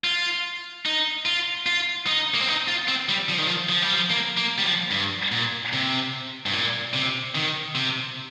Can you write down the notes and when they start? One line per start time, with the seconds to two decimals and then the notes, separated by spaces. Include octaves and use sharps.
0.04 F4
0.86 D#4
1.26 F4
1.66 F4
2.07 D#4
2.34 A#3
2.40 C4
2.48 D#4
2.68 F4
2.88 C4
3.09 G3
3.29 F3
3.38 D#3
3.47 F3
3.69 F3
3.82 G3
3.95 F3
4.10 A#3
4.37 A#3
4.58 G3
4.64 F3
4.91 G2
5.32 A#2
5.73 C3
6.46 G2
6.53 A#2
6.94 C3
7.35 D#3
7.75 C3